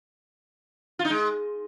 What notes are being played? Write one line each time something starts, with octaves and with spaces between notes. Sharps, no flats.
F4
D#4
G#3